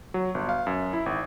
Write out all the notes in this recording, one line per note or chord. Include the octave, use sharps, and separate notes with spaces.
F#3
G1
F5
F#2
E4
G#1